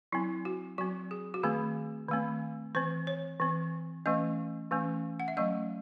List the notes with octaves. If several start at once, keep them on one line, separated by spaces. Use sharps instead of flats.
F#3 C4 E4
F#4
F#3 C4 F#4
G#4
F#4
D#3 A3 C4 G#4
D#3 A3 C4
E3 C4 C5
C#5
E3 C4
E3 A3 C#4 D#5
E3 A3 C#4
F#5
E5
F#3 A3 C#4 D#5